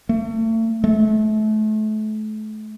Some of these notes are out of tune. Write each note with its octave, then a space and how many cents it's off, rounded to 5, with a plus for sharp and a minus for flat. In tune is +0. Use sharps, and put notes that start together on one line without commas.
A3 +35
A3 -35